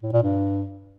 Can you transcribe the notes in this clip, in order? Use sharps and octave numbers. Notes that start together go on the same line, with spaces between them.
A2
A#2
G2